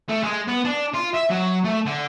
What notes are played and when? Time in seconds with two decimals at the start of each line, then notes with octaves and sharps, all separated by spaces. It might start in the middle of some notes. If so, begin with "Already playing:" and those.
0.09 A3
0.24 G#3
0.48 B3
0.65 D4
0.94 F4
1.15 E5
1.30 F#3
1.64 A3
1.86 D3